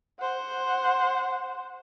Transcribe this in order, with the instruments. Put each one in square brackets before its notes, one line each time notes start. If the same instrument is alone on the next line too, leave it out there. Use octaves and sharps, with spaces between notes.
[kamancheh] C5 F#5